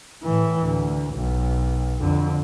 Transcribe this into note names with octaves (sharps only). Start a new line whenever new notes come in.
A2 E3
D2
B1
F2 D3